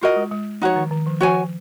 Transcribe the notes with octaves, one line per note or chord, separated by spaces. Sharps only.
F4 F#4 A#4 D#5
G#3
G#3
F3 D#4 F#4 C#5
D#3
D#3
F3
F3 F#4 C#5 G#5